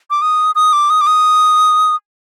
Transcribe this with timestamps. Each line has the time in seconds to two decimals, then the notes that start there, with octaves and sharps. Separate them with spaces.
0.10 D6
0.22 D#6
0.55 D#6
0.73 D6
0.90 D#6
1.01 D6
1.07 D#6